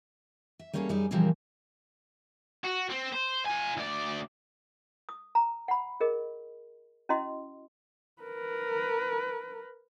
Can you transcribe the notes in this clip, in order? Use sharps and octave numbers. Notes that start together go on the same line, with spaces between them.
E5
G3 A#3 C#4 E4 G#4 A4
F#2 G3 D#4 G#4
A#2 C#3 E3 F3 G3 A#3
F#4
C4
C5
F4 G#5
D2 D5
D#6
A#5
F#5 B5
G#4 A#4 D#5
C#4 E4 F#4 D#5 C6
A#4 B4